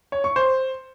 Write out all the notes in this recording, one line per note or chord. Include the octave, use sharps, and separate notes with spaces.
C#5
C#6
C5